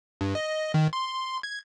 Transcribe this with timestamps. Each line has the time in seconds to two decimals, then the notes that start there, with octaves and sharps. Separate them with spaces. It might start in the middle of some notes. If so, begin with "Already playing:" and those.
0.21 G2
0.35 D#5
0.74 D#3
0.93 C6
1.43 G#6